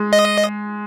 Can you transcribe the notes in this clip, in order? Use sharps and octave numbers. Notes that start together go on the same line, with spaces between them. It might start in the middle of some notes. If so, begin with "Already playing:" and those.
Already playing: G#3
D#5